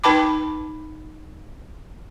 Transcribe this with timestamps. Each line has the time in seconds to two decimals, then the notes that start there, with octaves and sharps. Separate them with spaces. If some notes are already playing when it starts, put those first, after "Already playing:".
0.04 D#4 B4 G5 A5 B5 D6